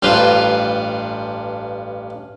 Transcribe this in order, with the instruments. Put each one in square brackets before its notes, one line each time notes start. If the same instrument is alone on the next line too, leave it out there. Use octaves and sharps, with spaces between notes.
[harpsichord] A1 G2 F4 B4 C5